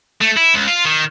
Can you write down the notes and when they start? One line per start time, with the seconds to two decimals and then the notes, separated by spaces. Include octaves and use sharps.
0.21 A3
0.36 E4
0.54 C#2
0.68 F4
0.85 D#3